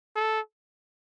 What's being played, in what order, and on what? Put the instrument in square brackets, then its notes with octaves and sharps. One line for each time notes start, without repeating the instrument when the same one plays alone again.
[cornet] A4